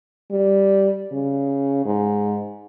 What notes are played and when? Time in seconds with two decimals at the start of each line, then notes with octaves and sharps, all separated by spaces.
0.31 G3
1.12 C#3
1.85 G#2